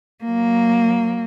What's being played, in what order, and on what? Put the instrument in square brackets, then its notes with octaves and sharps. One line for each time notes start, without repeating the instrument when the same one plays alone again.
[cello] F#3 A#3